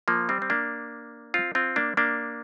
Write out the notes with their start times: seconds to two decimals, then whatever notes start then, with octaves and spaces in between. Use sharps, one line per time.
0.08 F3 A#3
0.29 G3 C4
0.42 C4
0.50 A#3 D4
1.34 C4 F4
1.55 C4 F4
1.76 A#3 D4
1.97 A#3 D4